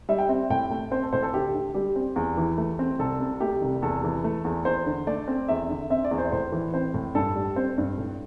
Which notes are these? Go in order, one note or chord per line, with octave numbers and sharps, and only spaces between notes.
G3 E5
G5
C4 E5
A2 G5
A3
C4 C5
A4
A2 C5
A4
D2 G4
D3
G3 G4
C4
E2
E3
A3
C4
C2 A4
C3
A3 G4
C2
E2 A4
E3
A3
E2
E2 C5
D3
A3 D5
C4
E2 E5
D3
C4 E5
D5
E2
C5
A2 C5
E3
C4 C5
A2
G2 A4
G3
C4 C5
G2
A2